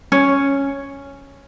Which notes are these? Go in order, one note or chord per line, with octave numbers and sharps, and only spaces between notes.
C#4